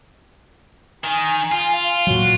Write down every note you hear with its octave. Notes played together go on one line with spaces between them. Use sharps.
D#3 G#5
F4 G#5
F5
A#2 F#3 F#4